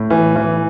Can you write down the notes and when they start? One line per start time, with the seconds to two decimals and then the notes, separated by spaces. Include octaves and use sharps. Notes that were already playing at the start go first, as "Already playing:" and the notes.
Already playing: A2
0.10 E3
0.36 E3